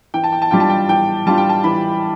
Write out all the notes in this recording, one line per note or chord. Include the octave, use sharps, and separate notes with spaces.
E3 G5
A5
G5
A5
G3 D4 F4 G5
A5
G5
E3 G5
G3 D4 F4 A5
G5
A5
E3 B5